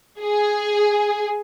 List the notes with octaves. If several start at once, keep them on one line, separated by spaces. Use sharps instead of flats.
G#4